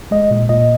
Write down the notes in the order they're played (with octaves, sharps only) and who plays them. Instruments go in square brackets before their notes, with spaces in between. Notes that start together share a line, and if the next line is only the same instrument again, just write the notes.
[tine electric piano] G#3 D#5
A#2
A#2 D#5